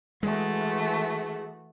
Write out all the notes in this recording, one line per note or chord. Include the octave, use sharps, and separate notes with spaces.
E3 G#3 A3 F#4